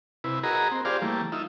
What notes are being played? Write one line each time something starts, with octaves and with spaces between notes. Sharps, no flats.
C3 E4 B4
F#4 G#4 A#4 D#5 A#5 B5
C4
F4 G4 G#4 C5 D5 F5
E3 G3 A3 A#3
D#4 F4 E5